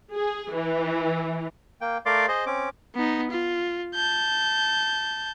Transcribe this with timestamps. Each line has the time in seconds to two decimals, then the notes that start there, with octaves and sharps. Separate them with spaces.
0.12 G#4
0.52 E3
1.81 A#3 G5
2.06 A3 A#4 D5 F5 C6 D6
2.28 G#4 C5 D#5 C6
2.46 C4 C#4 D6
2.95 B3 D#4
3.31 F4
3.95 A5 G6